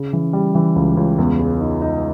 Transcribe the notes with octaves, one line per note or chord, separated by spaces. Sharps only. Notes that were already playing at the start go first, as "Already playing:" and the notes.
Already playing: C#3
E3
G3
E3
C#2
C#2
E2
G#3
D#4
D#4